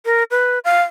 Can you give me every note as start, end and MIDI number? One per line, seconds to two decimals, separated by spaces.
0.05 0.23 70
0.31 0.59 71
0.65 0.82 77